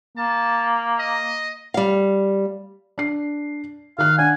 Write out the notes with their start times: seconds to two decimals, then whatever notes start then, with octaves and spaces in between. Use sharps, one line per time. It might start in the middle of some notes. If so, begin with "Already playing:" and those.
0.18 A#3 A5
0.99 D#5
1.74 G3 F5
2.98 D4 C7
3.99 D#3 F5 F#6
4.18 D4 F#5 G#5